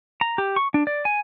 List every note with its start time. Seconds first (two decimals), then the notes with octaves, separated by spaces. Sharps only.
0.21 A#5
0.38 G4
0.56 C#6
0.74 D4
0.87 D5
1.05 G#5